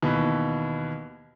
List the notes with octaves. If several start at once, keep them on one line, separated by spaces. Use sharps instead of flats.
D#2 B2 E3